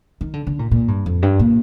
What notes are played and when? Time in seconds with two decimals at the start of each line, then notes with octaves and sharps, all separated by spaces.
0.21 D#3
0.33 D3
0.47 D3
0.59 A#2
0.71 A#2
0.88 G2
1.06 F2
1.22 G2
1.39 A#2